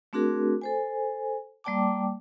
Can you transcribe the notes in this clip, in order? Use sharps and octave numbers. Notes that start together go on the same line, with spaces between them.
A3 C4 D4 F#4 G#4 A#4
A4 C5 G#5
G3 A#3 D5 G5 A5 D6